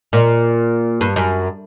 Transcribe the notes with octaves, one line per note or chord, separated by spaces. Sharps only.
A#2
G2
F#2